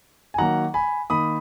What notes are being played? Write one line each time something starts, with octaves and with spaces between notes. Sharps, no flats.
G#5
D#3 F#3 A#3 F#5 A#5
G#5 B5
D#3 A#3 B5 D#6